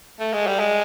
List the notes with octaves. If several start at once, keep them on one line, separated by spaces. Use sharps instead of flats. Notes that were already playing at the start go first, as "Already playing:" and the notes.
A3
G#3
G3
G#3